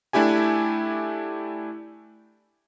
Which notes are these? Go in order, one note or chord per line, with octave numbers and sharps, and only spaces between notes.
A3 D4 E4 G4 G#5